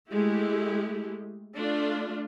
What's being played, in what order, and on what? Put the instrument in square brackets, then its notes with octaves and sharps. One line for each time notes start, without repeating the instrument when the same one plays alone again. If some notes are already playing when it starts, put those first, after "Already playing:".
[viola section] G#3 A3 E4 G4
A3 D4 F4